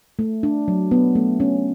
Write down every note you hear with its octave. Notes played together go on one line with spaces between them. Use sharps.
A3
D4
F#3
B3
A3
C#4